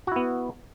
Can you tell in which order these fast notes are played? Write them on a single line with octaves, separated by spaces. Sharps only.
F#4 E4 B3